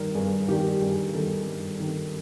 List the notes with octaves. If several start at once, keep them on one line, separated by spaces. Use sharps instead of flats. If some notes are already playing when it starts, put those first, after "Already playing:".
Already playing: G2 D#3 G3 A#4
G2 G#4
D#3 G3 G4
G2 G#4
D#3 G3 A4
G2
D#3 G3